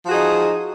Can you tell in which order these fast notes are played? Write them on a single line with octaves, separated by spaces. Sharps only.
F3 F#4 G#4 D#4